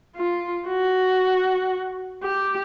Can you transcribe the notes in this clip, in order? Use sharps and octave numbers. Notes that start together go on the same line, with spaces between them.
F4
F#4
G4